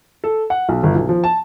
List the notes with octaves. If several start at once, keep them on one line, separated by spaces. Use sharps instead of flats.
A4
F#5
B1
G1
B1
F3
A5